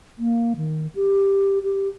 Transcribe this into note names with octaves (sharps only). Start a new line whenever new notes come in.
A#3
D#3
G4
G4